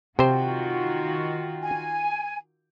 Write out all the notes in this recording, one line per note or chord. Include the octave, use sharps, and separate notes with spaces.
C3 D#3 F4 F#4 C5 G5
G#5